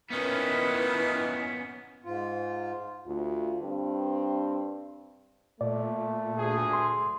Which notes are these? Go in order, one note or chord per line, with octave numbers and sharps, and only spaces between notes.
A#2 D#3 B3 C#4 E4 B4
G#2 F4
D2 F4
G2 C4
A#2 A3 D5
D2 G#4
C6